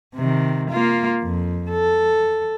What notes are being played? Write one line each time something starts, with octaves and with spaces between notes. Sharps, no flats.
C3 D#3
A#3 F4
F2
A4